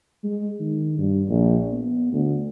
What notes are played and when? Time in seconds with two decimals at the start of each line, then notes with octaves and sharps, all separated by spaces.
0.24 G#3
0.60 D#3
0.98 G2
1.28 A#1
1.73 B3
2.13 D2